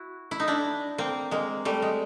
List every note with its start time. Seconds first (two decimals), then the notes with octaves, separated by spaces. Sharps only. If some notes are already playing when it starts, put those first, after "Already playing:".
Already playing: E4 F#4
0.31 E4
0.40 D#4
0.48 D4 E4
0.98 A#3 C4
1.31 G#3 A#3
1.65 G3 A3
1.82 G#3